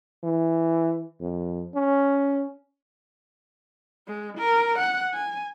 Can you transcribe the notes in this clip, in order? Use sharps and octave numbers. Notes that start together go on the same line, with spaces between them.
E3
F2
C#4
G#3
A#4
F#5
G#5